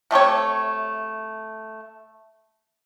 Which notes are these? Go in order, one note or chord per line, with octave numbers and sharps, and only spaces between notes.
C3 A3 G4 C#5